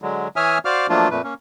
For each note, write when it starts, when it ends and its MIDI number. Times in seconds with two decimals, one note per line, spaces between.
0.02 0.28 50
0.02 0.28 54
0.02 0.28 56
0.36 0.58 52
0.36 0.58 73
0.36 0.58 76
0.36 0.58 80
0.36 0.58 87
0.36 0.58 89
0.65 0.87 66
0.65 0.87 72
0.65 0.87 74
0.65 0.87 77
0.65 0.87 86
0.65 0.87 89
0.89 1.09 53
0.89 1.09 54
0.89 1.09 57
0.89 1.09 58
0.89 1.09 62
0.89 1.09 65
1.11 1.22 41
1.11 1.22 46
1.11 1.22 57
1.11 1.22 71
1.23 1.34 58
1.23 1.34 61